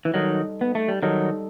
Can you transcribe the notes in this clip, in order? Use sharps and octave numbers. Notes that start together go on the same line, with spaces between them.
E3
D#3 F#3 G3 D#4 A4 D#5
B3
A3
G3
D#3 F#3 G3 D#4 A4 D#5